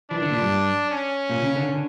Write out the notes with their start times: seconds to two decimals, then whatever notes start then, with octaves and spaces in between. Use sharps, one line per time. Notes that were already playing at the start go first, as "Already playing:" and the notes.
0.11 E3 D4
0.22 D3
0.31 A#2
0.41 G2
0.90 C#4
1.30 A#2
1.42 C#3
1.56 D3
1.69 D3